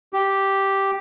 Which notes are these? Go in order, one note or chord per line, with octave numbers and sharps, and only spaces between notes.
G4